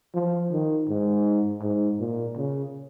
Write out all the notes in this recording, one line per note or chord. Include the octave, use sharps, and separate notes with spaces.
F3
D#3
G#2
G#2
A#2
C#3